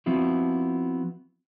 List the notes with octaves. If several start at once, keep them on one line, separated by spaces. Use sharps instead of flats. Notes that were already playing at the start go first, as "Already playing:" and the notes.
F3 B3 C4 E4 F#4